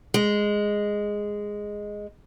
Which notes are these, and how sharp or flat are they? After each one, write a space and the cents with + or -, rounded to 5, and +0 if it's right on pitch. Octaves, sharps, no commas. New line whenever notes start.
G#3 -5